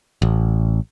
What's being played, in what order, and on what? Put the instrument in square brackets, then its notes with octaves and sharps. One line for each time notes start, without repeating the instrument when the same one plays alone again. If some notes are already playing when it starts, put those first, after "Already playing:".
[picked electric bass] A1